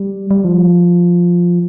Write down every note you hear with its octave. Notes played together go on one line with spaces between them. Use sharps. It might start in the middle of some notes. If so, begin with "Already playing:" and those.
Already playing: G3
G3
F3